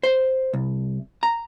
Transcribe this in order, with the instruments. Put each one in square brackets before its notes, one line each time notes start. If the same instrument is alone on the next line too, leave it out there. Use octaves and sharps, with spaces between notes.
[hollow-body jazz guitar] C5
C2
A#5